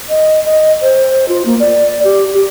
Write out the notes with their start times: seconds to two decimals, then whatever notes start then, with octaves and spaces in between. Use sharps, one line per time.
0.09 D#5
0.44 D#5
0.82 C5
1.28 F4
1.46 A#3
1.60 D5
2.04 G4
2.34 G4